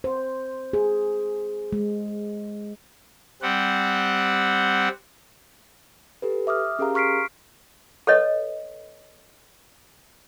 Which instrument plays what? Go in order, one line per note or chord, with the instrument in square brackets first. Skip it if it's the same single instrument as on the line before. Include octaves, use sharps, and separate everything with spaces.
[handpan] C5
G#4
G#3
[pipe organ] G3 C4 F#5
[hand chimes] G4 A4 B4
E5 D6 D#6 F6
C#4 G4 G#4 A#4 F5 A#5
C6 C#6 F6 B6 C7 D7
[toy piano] A4 B4 C#5 D#5